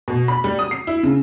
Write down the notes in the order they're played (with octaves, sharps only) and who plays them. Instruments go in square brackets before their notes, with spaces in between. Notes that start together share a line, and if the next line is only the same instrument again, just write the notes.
[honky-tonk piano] B2
B5
G3
D#6
C7
E4
C#3